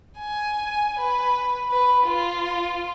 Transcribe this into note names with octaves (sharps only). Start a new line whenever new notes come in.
G#5
B4
B4
F4